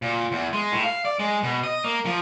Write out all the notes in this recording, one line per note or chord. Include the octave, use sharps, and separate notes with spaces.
A#2
E2
G#3
A2
F5
D5
G#3
B2
D#5
A#3
F3